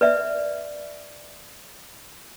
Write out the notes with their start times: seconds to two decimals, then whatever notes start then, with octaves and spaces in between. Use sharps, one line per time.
0.01 B4 D5 E5